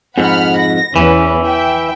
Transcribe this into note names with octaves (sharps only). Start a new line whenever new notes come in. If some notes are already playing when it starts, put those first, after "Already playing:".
F2 G#2 F#5 B5 F6
A#6
E2 E3 C#4 B4
E5 G5